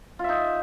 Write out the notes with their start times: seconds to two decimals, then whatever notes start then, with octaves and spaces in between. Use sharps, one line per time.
0.19 F4
0.24 E5
0.29 D#4